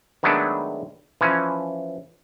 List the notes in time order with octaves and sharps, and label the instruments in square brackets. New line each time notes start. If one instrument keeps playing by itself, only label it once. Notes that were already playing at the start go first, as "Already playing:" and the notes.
[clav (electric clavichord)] D#3 F#3 G#3 A3 B3 D4
E3 F3 C#4